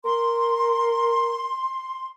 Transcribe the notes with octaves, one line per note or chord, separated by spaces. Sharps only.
A#4 C6